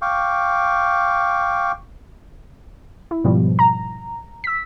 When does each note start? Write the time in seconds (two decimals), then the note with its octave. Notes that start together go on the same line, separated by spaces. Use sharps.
0.02 F5 G5 C#6 D6
3.11 E4
3.24 G#2 B2 F3 G3
3.59 A#5
4.44 E6 B6